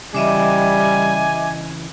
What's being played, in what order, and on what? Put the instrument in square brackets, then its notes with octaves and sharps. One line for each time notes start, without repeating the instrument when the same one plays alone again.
[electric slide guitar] C#3 E3 [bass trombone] G3 [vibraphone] D#5 E5 D6 [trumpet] G#5